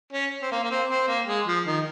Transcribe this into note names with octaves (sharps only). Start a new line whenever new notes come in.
C#4
C4
A#3
A#3
C4
C4
A#3
G#3
F3
D#3